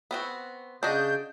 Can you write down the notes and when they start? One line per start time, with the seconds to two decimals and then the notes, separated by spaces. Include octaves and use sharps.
0.11 B3 C4 F#4
0.83 C#3 D4 F#4 D#5 G6